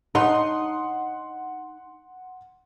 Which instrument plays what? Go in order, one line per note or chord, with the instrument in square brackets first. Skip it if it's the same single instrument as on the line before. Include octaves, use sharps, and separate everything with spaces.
[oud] D#4 [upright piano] F#5 C6